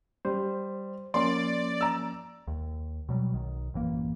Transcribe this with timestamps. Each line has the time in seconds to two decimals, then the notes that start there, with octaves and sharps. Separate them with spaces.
0.25 G3 C5
1.14 F3 A#3 C#4 D5 C6
1.81 A#5 E6
2.47 D#2
3.09 B2 F#3 G3
3.33 B1 D#3
3.74 A1 F#2 E3 A#3